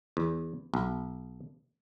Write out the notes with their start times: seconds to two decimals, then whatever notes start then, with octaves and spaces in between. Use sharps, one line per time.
0.17 E2
0.74 B1